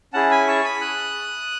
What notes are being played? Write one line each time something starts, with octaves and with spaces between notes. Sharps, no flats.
C#4 E4 G#4 F#5 A5
G#5 B5
A5 C#6
B5 D#6
D#6 F#6